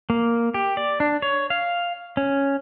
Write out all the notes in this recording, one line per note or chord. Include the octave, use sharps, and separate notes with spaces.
A#3
G4
D5
D4
C#5
F5
C#4